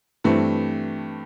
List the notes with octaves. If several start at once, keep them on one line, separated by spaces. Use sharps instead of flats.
G2 E3 A3 C4